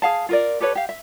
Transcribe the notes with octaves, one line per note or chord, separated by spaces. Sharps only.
G#4 F5 A5
F4 A#4 D5
G4 A4 B4 C#5
G4 F5
E5